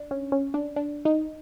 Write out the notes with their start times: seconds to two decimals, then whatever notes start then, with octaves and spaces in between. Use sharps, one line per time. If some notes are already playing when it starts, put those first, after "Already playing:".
Already playing: D4
0.11 C#4
0.32 C#4
0.54 D4
0.76 D4
1.05 D#4